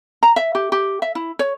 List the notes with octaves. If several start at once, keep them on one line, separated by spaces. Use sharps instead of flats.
A#5
E5
G4
G4
E5
E4
C#5